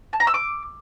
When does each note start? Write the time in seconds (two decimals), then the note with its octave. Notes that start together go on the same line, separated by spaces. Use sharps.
0.13 A5
0.20 A#5
0.27 E6
0.34 D6